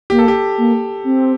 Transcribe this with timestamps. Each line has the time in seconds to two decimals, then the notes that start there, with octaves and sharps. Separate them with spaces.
0.10 A#3 G4
0.19 A4
0.28 G4
0.58 A#3
1.04 C4